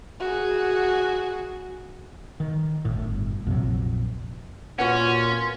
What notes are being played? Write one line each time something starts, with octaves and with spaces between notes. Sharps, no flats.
F#4 G#4
D#3
G1 A2
A#1 F2 C3 F#3
A#2 C#4 F4 F#4 B4 F#5